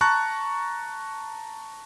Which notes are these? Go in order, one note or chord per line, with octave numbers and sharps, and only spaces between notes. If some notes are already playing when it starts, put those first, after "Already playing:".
A5 A#5 C#6 F#6